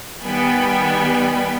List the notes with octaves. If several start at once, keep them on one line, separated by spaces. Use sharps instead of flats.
D#3 G3 B3 G5 G#5 B5